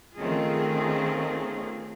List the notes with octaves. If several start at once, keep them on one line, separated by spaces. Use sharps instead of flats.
D#3 A3 C4 C#4 F4 G#4